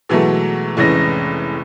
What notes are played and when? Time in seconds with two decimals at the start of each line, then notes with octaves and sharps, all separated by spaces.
0.09 B2 E3 F#3 G#3 A3
0.77 F1 A2 E3 G#3 C#4 A#6